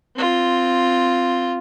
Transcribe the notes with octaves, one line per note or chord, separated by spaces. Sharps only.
C4 F4